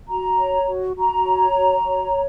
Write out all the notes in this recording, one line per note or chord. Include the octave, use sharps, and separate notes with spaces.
F#4 A#5
C#5
F#4
F#4 A#5
C#5
F#4
C#5